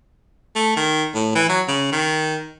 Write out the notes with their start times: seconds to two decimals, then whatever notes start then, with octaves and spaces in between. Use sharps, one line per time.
0.56 A3
0.77 D#3
1.15 A2
1.36 E3
1.49 F#3
1.68 C#3
1.92 D#3